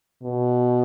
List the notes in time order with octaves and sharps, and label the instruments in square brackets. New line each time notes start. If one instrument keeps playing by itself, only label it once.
[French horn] B2